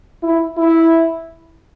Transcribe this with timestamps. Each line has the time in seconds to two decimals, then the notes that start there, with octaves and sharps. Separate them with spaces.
0.23 E4
0.57 E4